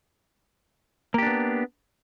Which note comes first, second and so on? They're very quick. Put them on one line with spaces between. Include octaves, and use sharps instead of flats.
A#3 G4 D4 B3